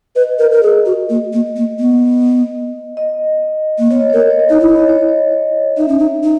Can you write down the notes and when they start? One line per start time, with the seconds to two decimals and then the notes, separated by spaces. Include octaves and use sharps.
0.16 B4 D#5
0.39 A#4
0.52 A#4
0.63 G#4
0.86 F#4
1.10 A#3
1.33 A#3
1.56 A#3
1.79 B3
2.97 D#5
3.79 A#3
3.91 B3 C#5
3.99 D#5
4.10 A#4 C#5
4.20 D#5
4.30 C#5
4.39 D#5
4.49 D#4 C#5
4.59 E4 D#5
4.69 C#5
4.79 D#5
4.89 C#5
4.99 D#5
5.09 C#5
5.77 D#4 E5
5.88 C#4
5.99 D#4
6.24 D#4